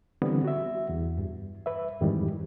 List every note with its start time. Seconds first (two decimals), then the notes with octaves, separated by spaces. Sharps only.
0.22 D3 E3 G3 B3 C4
0.44 F#4 E5
0.89 E2
1.18 G2
1.66 B4 E5
2.01 F2 G#2 D#3 E3 G3